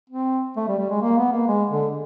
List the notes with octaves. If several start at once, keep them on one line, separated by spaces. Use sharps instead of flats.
C4
A3
G3
G3
G#3
A#3
B3
A#3
G#3
D3